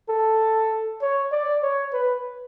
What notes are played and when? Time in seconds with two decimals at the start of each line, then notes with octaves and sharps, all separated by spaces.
0.09 A4
1.02 C#5
1.32 D5
1.63 C#5
1.94 B4